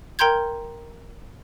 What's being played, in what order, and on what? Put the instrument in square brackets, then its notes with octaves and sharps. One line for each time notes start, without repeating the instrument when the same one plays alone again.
[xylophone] A#4 G5 A#5 C6 G6 G#6